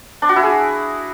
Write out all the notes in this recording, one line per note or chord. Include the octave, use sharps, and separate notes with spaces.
D4
F#4
E4
G#4